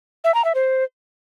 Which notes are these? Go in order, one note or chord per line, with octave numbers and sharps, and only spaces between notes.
E5
A#5
E5
C5